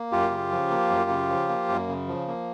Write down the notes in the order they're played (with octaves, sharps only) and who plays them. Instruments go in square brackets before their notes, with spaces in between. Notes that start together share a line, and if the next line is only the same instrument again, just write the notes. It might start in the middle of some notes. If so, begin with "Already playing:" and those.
Already playing: [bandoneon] A#3
F#2 F4 G4
C#3
F3
A#3
F#2
C#3
F3
A#3
F#2
C#3
F3
A#3